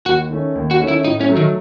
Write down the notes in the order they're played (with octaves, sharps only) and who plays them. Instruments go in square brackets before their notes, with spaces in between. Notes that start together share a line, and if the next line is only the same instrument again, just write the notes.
[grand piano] D#2 [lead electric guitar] F#4
[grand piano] D#3 A3 C#4
D#2
[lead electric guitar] F#4
[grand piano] D#3 A3 C#4
[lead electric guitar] E4
[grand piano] A2 [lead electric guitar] D#4
[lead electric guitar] C#4
[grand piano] F#3 A3
[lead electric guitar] D#3